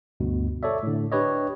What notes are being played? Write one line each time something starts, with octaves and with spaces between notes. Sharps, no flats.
D2 G2 B2
A4 C#5 D5 E5
A2 D3
D4 G4 B4 C#5 D#5